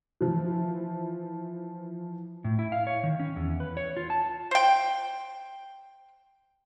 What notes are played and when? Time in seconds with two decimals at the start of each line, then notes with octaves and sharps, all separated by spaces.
0.21 E3 F3
2.44 A2
2.59 E4
2.72 F5
2.87 C#5
3.04 D#3
3.20 C#4
3.36 E2
3.60 B4
3.77 C#5
3.97 F4
4.10 A5
4.51 C5 G5